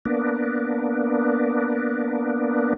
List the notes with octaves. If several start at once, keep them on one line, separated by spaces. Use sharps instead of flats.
A#3 B3 D4